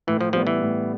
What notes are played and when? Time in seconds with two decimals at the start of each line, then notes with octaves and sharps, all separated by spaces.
0.07 A2 E3
0.21 F3
0.33 F3 G3 B3
0.47 E3
0.60 A2